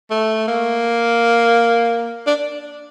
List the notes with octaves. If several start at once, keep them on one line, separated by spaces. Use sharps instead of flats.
A3
A#3
D4